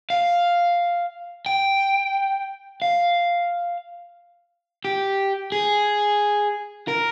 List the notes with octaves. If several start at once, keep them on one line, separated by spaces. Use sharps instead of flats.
F5
G5
F5
G4
G#4
A#4